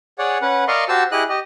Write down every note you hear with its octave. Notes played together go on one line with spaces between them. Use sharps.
G#4 C#5 D5 F#5
C#4 B4 F#5
A#4 D5 D#5 F5 C6 C#6
F#4 G4 C5 A5 E6
E4 G4 G#4 D#5 F#6
G4 D#5